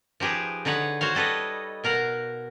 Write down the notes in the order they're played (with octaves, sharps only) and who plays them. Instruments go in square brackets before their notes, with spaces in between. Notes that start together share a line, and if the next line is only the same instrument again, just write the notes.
[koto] F3 D#4 G4 G#4 B4
D3 D#4 B4 C#5 F#5
F#4 C5 C#5 F5
G3 A4 B4 C#5 D#5
B2 A#4 F5 F#5